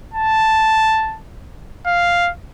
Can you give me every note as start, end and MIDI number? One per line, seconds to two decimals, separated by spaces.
0.13 1.17 81
1.86 2.30 77